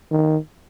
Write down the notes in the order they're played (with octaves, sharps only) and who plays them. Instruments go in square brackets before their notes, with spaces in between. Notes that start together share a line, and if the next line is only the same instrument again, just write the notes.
[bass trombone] D#3